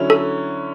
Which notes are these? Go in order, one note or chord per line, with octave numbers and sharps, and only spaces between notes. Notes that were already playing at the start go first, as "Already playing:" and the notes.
Already playing: D3 F#3 C#4 E4
A4